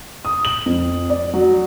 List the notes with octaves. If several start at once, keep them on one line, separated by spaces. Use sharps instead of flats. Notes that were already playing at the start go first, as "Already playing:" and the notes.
D#6
F#7
F2
D5
F#3